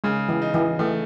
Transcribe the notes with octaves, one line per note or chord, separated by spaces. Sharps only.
C#3 G#3
E3
D#4
E3
E3 A3